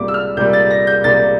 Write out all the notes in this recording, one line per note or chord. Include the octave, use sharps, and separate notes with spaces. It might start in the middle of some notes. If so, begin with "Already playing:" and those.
Already playing: C2 A#2 G3 D6
E6
F6
C2 A#2 G3 G6
A6
A#6
G6
C2 A#2 G3 A6